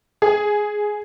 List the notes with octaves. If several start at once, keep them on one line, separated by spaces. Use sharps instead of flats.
G#4